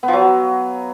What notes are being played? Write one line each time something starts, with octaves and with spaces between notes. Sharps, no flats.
B3
F3
F#3